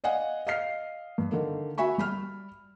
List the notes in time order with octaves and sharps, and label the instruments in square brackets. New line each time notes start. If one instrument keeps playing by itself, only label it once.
[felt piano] D5 D#5 F5 F#5 G#5
D#5 F5 F6 C7
G2
D3 D#3 A#3
F#4 E5 G#5 B5 C#6
G3 B5 F6